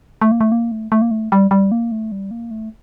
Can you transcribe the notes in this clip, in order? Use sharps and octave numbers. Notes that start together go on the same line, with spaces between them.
A3
A#3
A3
A#3
A3
A3
A#3
A3
G3
G3
A#3
A3
G3
A#3
A3